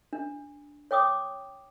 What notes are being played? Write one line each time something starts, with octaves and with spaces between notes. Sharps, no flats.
D4
C#5 G5 D6 D#6